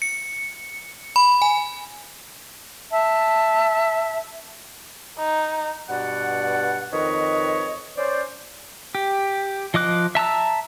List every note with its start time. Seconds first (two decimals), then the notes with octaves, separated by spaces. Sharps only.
0.02 C#7
1.16 B5
1.42 G#5
2.91 E5 A5
5.18 D#4
5.89 G2 B2 D5 F#5
6.92 F2 D#3 B4 C#5 D#5
7.97 C#4 C5 D5
8.95 G4
9.74 F3 D#5 D6 F#6
10.15 E5 A5 A#5 E6